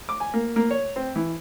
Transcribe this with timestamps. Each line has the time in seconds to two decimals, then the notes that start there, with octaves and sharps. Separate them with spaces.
0.09 D6
0.20 G#5
0.34 A#3
0.56 A#3
0.71 C#5
0.96 C4
1.16 E3